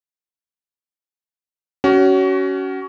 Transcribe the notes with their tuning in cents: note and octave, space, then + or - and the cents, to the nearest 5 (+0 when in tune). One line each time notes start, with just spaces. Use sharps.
C#4 +15 F#4 +30